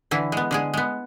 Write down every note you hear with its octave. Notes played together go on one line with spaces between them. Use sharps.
D3 E3 E4
G#3 B3
D3 G#3 G#4
G#3 B3